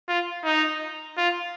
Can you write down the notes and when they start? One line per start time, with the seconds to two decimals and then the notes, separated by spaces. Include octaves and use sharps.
0.08 F4
0.44 D#4
1.18 F4